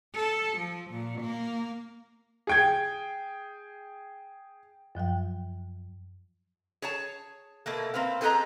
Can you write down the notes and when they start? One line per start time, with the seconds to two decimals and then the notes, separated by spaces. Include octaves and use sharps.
0.15 A4
0.57 F3
0.91 A#2
1.21 A#3
2.47 G#4 G5 G#6
4.95 F#2 F3 F#3 G5
6.82 G#4 C#5 A5
7.66 B2 A3 A#3
7.94 A#3 C4 B4 F5
8.21 C4 G#4 A4 B4 D#5 A#5